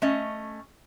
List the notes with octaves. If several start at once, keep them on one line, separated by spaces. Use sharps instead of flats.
A3 C#4 D#5